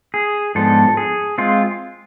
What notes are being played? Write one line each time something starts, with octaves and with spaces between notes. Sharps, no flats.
G#4
G#2 F3 B3 D4 A4
G#4
G#3 C4 F4